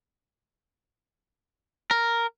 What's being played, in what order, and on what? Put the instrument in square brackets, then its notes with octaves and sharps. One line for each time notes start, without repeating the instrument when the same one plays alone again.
[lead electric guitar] A#4